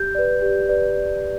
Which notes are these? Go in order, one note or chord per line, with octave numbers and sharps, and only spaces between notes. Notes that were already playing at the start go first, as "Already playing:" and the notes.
Already playing: G4 G6
B4 D5
G4
B4 D5